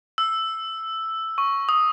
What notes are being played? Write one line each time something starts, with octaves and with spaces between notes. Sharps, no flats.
E6
C#6
D#6